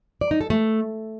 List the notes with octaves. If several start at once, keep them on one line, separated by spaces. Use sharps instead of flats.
D5
D#4
A4
A3